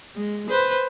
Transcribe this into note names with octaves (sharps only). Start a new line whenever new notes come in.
G#3
B4 C5